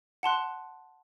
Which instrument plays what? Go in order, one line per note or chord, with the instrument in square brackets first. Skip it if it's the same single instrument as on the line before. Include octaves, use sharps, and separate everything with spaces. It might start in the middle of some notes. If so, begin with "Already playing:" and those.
[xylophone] F#5 A5 C6 F#6